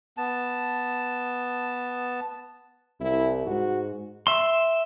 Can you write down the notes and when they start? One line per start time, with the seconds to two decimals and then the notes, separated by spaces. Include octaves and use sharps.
0.17 B3 A5
3.01 C2 E4
3.47 G#2 F#4
4.27 E5 C6